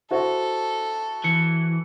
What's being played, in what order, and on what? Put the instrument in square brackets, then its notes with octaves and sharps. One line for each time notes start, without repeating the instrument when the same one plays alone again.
[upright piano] E4 F#4 C5 [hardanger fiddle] A4
[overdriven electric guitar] E3 [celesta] C#7